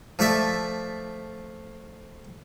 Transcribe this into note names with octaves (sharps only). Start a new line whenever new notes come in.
F3 A3 D5 E5